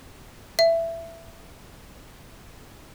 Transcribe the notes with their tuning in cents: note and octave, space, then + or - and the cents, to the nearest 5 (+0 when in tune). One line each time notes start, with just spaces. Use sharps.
E5 +15